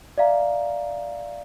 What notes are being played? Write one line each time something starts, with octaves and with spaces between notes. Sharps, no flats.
D5 E5 F5 A#5